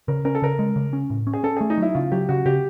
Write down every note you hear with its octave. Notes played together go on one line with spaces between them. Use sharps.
C#3 A#4
C#4 A#4
A4
C#3 A#4
G#3
C#3
C#4
A2
C#4
G#4
C#4 A4
A3 G#4
D#4
F#3 E4
C#3 F4
F#3 G4
C#3 F#4
C#3 G4